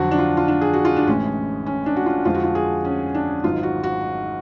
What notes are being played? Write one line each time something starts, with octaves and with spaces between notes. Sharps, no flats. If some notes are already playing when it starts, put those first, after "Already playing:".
Already playing: F2 D3 F#3 F#4
D4
F4
F4
D4
G#4
F#4
F4
D4
A1 A2 G#3 C#4
C#4
D4
F#4
F4
F2 D3 F3 G#3 F4
F#4
F4
G#4
C#4
D4
G#1 G#2 F#3 F4
F#4
F#4